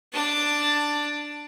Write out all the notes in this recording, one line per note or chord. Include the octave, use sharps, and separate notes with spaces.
D4 A5